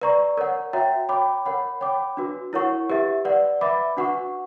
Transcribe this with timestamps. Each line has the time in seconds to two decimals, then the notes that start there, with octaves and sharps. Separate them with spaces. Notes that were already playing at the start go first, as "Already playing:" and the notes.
0.02 B4 D5 A#5 C#6
0.37 A#4 C#5 F#5
0.73 F#4 C#5 E5 G5 A#5
1.09 C#5 G5 B5 D6
1.45 A#4 C#5 F#5 B5
1.81 C#5 G5 B5 D6
2.17 D4 F#4 B4
2.53 E4 A#4 C#5 F#5 C#6
2.90 G4 B4 E5
3.25 B4 D5 F#5
3.61 B4 E5 B5 D6
3.97 D4 F#4 B4 F#5 C#6